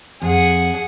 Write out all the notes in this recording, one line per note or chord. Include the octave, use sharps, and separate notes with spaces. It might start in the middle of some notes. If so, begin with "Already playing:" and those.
F2 G#4 F#5